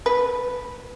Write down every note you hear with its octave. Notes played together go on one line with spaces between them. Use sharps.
B4